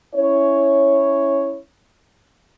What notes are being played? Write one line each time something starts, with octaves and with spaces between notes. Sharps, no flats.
C#4 E4 C#5